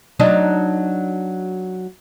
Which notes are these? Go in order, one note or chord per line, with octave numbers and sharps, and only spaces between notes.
F#3 D4 D#4